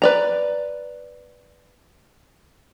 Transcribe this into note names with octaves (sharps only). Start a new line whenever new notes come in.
B4 D5 A#5